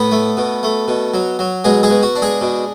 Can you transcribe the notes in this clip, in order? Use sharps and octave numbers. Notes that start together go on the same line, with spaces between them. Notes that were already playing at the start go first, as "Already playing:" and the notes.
Already playing: A2 B3 B4
A3
B2
A3
B2
F#3
F#3
B2 G#3 G#4
G#3 G#4
B2
F#4
D4
G#3 G#4
B2